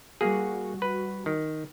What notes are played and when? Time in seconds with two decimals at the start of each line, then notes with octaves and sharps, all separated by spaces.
0.21 G3 A#3 F#4 G#4
0.82 B4
1.26 D#3